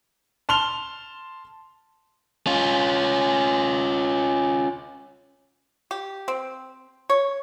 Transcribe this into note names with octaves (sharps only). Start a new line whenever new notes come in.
A5 C6 F6 F7 G7
C#4 F4
G4
C4
C#5